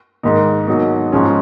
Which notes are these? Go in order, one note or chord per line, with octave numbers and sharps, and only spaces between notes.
G#2 D#3 A#3 D#4
B2 F#3 A#3 D#4
G#2 F3 G#3 C#4